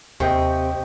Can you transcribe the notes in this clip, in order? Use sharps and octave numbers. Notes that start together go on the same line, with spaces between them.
D#2 C3 D#5 G5 C#6